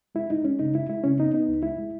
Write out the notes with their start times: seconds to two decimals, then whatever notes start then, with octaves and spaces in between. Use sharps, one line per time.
0.15 G#3 E4
0.30 G#3 D#4
0.45 G#3 C#4
0.59 C#3 D#4
0.75 G#3 E4
0.89 G#3 E4
1.04 C#3 C#4
1.19 B3 D#4
1.34 B3 D#4
1.48 C#2
1.63 G#3 E4
1.79 G#3